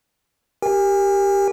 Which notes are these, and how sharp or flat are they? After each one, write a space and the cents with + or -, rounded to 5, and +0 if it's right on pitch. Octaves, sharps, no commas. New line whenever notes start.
G4 +0 A#4 +0 G#5 -35